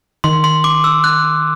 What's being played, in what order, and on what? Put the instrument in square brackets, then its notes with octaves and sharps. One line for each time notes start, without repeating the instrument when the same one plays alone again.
[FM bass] D#3 [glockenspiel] C6
[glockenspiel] C6
D6
E6
F#6